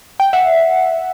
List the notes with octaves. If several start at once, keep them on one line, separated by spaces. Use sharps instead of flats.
G5
E5 F#5